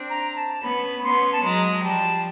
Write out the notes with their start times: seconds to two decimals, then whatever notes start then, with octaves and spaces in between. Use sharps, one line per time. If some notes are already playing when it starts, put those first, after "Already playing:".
Already playing: C4 D4
0.10 A#5
0.36 A5
0.62 B3 C#4 B5
1.03 B3 C#4 C6
1.33 A5
1.43 F#3 G#3 A#5
1.84 F3 G3 A5